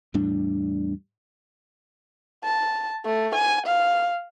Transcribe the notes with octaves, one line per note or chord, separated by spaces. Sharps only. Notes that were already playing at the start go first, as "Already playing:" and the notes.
E2 A2 G3 D4
A5
A3
G#5
F5